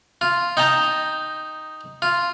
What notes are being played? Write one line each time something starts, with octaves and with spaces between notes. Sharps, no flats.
F4
D#4 G5 A5 A#5
F4